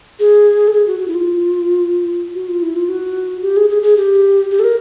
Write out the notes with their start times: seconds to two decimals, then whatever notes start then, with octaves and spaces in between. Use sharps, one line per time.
0.20 G#4
0.68 A4
0.73 G#4
0.87 F#4
1.00 F#4
1.08 E4
1.14 F4
2.35 F#4
2.48 F4
2.62 E4
2.76 F4
2.89 F#4
3.42 G4
3.57 G#4
3.69 G#4
3.83 G#4
3.97 G4
4.51 G4
4.59 A4
4.64 A#4